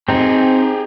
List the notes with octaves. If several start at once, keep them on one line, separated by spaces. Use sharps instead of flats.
C4 D#4 G4 G#4